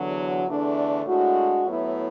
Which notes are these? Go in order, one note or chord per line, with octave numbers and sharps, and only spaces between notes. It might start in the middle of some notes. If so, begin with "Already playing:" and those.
Already playing: E2 D3 F#3
E2 D3 A3 D4
A2 G#3 D4 F#4
A2 F#3 B3 E4